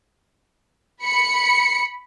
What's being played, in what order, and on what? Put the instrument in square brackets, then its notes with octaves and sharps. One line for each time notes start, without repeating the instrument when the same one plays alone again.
[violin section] B5 C#7